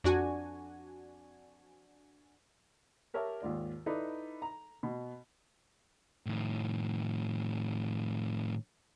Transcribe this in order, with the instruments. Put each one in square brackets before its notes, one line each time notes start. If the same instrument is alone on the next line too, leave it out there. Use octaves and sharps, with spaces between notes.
[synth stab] F2 D4 F#4 G#5
[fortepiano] G4 A#4 C#5 E5 A5
D#2 G#2 F4 D5
D#4 E4 A4 B4 D5
A#5
B2
[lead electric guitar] A2 D#3